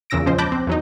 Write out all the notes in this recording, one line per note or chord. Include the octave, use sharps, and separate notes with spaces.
E2 A#2 C#3 E6 A#6 D7
C#2 F3 C#4 C5 D#5
A5 B5 D6 F#6 G6 A#6
C4
E2 F#3 D#4